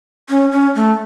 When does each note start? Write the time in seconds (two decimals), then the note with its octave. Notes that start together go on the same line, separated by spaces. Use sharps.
0.30 C#4
0.52 C#4
0.75 A3